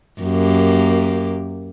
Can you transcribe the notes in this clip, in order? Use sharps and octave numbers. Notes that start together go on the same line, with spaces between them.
F#2 A#3 G4